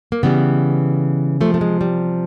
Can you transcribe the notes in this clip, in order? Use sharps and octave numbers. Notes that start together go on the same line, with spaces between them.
A#3
C#3 E3 G3 B3
C3 F3 A3
A3
G#3
G3